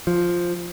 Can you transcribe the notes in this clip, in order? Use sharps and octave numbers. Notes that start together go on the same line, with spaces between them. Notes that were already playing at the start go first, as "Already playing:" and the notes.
F3